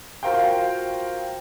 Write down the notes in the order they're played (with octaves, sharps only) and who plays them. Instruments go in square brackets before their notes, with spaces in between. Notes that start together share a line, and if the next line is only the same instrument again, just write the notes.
[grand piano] F4 F#4 A#4 C5 F5 G5